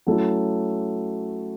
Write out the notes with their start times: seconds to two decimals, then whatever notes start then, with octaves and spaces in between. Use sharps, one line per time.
0.07 F#3 A3 C#4 E4